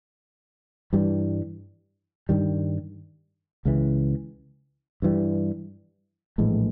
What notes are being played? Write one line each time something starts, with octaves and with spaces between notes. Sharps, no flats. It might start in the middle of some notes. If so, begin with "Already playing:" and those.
G2 E3 G3
G2 D#3 G3
C#2 C#3 E3
G2 E3 G3
A#1 A2 E3 G#3